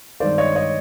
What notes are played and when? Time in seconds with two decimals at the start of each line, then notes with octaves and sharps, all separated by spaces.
0.20 G2 D#3 G#3 C4 C5 D5
0.38 C#5 D#5
0.56 C#5 D#5